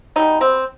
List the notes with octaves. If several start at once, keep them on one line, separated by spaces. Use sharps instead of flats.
B2 G3 B3 D#4
C4